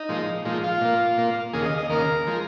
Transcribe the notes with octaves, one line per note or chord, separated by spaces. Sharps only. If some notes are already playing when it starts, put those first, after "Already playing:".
Already playing: D#4
A#2 F3 G#3
A#2 F3 G#3
F4
A#2 A#3
A#2 A#3
D#2 C#3 A#3 G#4
D#5
D#5
D#2 C#3 A#3 A#4
F3 G#3